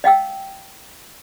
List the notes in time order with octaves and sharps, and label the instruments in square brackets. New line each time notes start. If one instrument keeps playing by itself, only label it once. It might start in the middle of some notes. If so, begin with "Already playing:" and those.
[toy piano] D#5 F5 G5 E6